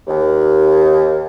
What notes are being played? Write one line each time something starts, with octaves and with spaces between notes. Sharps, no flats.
D#2